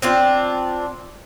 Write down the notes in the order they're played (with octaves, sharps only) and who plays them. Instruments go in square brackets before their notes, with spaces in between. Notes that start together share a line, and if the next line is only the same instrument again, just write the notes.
[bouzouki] C4 D4 F4